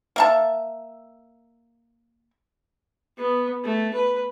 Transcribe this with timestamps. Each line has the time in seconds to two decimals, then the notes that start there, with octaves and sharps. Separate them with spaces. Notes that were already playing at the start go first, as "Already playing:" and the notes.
0.16 A#3 E5 A5
3.17 B3
3.64 A3
3.94 B4